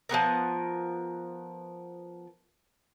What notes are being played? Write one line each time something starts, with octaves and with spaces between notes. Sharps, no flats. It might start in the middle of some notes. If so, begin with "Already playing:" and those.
F3 G#3 B3 A#4